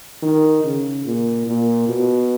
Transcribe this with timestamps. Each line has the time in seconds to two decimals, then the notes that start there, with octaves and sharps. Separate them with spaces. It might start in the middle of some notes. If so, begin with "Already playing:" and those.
0.23 D#3
0.64 C#3
1.06 A#2
1.47 A#2
1.88 B2